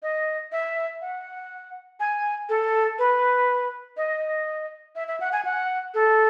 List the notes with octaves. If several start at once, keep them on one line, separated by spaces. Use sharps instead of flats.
D#5
E5
F#5
G#5
A4
B4
D#5
E5
E5
F#5
G#5
F#5
A4